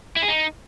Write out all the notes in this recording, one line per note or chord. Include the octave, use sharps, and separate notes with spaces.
E4
G#4
D#4